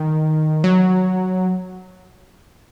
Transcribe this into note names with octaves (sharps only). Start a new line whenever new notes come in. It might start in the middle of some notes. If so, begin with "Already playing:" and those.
Already playing: D#3
F#3